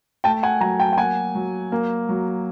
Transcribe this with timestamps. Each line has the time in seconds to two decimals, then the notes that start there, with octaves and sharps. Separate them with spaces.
0.24 A3 G5 A5
0.43 F#5 G#5
0.61 F#3 G#5 A#5
0.80 G5 A5
0.93 G5
0.98 A#3 F#5 G#5
1.35 F#3
1.72 A#3
2.09 F#3